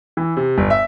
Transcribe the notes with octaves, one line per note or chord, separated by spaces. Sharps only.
E3
C3
G1
E5